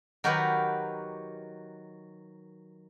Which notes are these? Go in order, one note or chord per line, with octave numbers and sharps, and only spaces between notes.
D#3 F#3 F#4 G4 A#4 B4